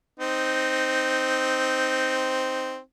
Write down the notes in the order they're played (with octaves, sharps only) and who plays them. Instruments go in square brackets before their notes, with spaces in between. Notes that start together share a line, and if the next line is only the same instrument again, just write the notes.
[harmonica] C4 D#4